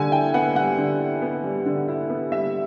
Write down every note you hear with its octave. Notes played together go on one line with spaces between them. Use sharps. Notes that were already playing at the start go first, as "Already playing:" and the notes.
Already playing: D3 G3 G#5
E4 G5
B3 F#5
G3 F#5
D3
E4
B3
G3
D3
E4
B3
G3 E5